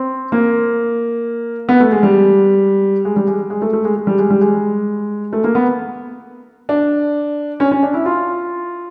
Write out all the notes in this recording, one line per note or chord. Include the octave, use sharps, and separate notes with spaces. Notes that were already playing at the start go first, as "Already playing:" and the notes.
Already playing: C4
A#3
B3
A3
G#3
G3
G#3
G3
G#3
G#3
A3
A3
G#3
G#3
G3
G#3
G3
G#3
A3
A#3
B3
D4
C#4
C#4
D4
E4
F4